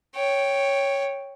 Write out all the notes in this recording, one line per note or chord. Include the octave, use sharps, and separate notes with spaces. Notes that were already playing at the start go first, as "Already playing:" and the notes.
C#5 G5